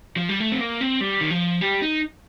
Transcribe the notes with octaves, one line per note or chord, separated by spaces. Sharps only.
F3
G3
A3
C4
A#3
C4
G3
D#3
F3
G3
D#4